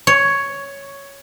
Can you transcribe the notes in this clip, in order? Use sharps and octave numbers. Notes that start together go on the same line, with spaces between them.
C#5